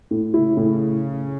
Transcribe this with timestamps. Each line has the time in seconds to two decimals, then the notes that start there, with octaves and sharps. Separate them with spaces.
0.11 A2
0.33 C#3 E4
0.57 A2